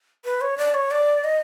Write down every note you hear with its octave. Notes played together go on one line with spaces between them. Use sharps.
B4
C#5
D5
C#5
D5
D#5